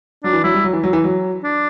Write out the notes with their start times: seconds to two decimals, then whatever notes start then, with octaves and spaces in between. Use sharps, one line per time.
0.24 F#3 D4
0.33 E3
0.44 F#3 E4
0.54 G3
0.64 F#3
0.73 E3
0.84 F#3
0.93 E3
1.04 F#3
1.44 D4